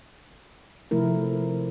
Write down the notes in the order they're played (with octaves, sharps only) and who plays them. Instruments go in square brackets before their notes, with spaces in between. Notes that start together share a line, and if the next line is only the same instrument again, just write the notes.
[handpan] C3 F3 A3 E4 A#4